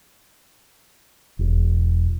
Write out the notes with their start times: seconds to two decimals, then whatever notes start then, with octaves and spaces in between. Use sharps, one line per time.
1.39 E1